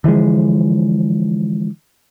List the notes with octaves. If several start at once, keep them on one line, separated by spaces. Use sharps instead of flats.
D3 E3 F3 G#3